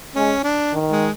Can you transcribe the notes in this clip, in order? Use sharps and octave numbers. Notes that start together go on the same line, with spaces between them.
G#3 C#4
D4
D#3
G#3